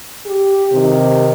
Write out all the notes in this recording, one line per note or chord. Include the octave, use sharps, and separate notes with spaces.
G4
C3 D#3